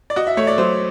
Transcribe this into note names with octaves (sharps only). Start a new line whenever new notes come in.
D5
F#4 D#5
E5
A3 C#5
D5
F#3 C5